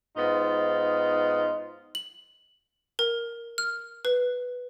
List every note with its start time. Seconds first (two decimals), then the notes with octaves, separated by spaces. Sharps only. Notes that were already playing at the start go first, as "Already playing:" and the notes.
0.16 G#2 B3 D#4 F4
1.95 F#7
2.99 A#4
3.58 F6
4.05 B4